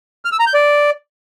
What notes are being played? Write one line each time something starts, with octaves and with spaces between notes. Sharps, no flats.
F6
E6
A#5
G6
D5